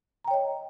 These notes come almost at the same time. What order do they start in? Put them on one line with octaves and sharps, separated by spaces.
A#5 G5 C#5 D#5